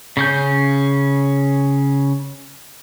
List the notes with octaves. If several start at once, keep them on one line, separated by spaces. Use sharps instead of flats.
C#3 C#4 G6